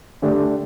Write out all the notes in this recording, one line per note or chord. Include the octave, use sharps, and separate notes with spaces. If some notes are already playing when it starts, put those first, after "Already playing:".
D3 A3 D4 G4